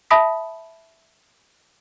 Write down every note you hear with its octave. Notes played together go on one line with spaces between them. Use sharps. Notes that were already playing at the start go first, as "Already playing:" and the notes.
E5 A5 B5 D#6 B6